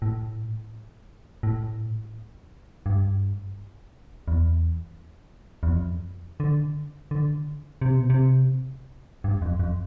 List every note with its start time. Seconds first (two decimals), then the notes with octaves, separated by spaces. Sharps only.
0.02 A2
1.43 A2
2.86 G2
4.28 E2
5.63 E2
5.69 F2
6.40 D3
7.11 D3
7.81 C3
7.95 B2
8.10 C3
9.24 G2
9.42 F2
9.59 F2